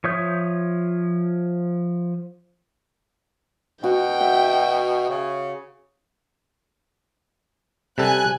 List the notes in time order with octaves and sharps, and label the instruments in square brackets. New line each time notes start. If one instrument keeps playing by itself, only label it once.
[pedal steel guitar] F3 C#5 E5 D#6 G6
[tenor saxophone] B2 [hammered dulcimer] F#4 [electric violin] G5
[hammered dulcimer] E5
[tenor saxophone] C#3
[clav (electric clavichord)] C3 G3 A4 [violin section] G#5 F#6